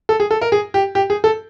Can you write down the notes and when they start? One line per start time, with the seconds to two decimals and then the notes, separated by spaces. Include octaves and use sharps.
0.09 A4
0.20 G#4
0.31 A4
0.41 A#4
0.52 G#4
0.74 G4
0.95 G4
1.10 G#4
1.24 A4